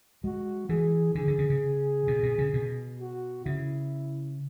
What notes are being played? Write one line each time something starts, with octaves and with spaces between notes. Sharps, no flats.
G#3 F#4
E3 G#4
D3 G#4
D3
C#3
C#3
B2
B2
C#3
B2
F#4
C#3 E4